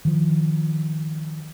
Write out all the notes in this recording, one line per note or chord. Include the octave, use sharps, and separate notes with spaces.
D#3 F3